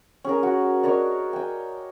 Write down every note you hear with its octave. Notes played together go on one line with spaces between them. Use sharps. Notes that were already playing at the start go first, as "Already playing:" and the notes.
C#4 G#4 A#4
F#4
D4 A#4 C#5 D#5
G5 G#5